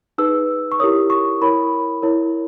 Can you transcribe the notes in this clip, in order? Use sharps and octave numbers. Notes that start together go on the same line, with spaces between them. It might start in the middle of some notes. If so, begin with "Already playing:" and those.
D#4 G#4 B4 E6
C#6
E4 G4 A#4 C#5 D#6
C#6
E4 A#4 C#5 B5
E4 A#4 C#5